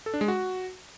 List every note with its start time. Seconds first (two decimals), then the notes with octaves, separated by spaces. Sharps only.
0.06 A4
0.14 D4
0.21 G#3
0.28 F#4